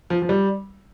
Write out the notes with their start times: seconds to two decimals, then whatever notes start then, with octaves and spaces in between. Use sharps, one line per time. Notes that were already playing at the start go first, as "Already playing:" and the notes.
0.10 F3
0.22 F3
0.29 G3